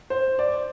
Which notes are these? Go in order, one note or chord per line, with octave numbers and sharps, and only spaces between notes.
C5
D5